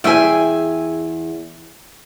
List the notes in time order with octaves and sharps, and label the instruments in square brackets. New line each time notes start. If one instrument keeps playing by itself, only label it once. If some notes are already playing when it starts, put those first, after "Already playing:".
[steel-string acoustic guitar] E2 G#5 [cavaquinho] G#4 E5 G5